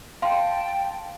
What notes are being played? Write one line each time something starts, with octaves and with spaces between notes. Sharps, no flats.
F5 G5 A5 C6